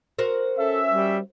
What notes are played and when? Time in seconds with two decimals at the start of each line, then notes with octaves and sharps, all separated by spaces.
0.19 F#4 A#4 C5
0.59 C#4 A4 E5
0.91 G3